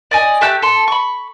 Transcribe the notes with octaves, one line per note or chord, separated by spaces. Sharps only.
D5 D#5 G#5
A3 G4 E5 F#6
A4 C6
B5 C#6